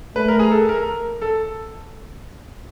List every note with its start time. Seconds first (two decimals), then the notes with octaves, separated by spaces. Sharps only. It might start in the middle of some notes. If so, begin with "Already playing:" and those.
0.16 A3 B4
0.28 A#4
0.39 G#4
0.52 A4
0.69 A#4
1.22 A4